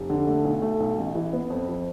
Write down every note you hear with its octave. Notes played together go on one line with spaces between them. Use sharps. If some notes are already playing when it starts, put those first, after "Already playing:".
Already playing: F1
D3
A3
B1
A3
B1
A1
E3
B3
F2
F3